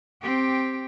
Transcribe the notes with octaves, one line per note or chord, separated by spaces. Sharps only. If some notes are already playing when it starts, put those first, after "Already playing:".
C4 G4